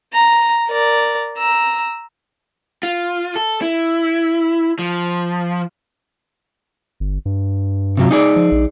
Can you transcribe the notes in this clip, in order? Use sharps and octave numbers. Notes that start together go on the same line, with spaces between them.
A#5
A#4 D5
A#5 E6
F4
A4
E4
F3
G1
G2
C3 F#3 F4
D#4 G#4 D5
F3
A#1